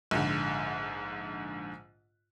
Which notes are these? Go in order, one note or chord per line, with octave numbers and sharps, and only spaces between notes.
A#1 G#2 D3